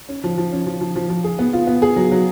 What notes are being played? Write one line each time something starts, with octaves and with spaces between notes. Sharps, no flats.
C#4
F3
F3
C#4
F3
F3
F3
F3
G#4
B3
F4
B3
G#4
F#3
F#3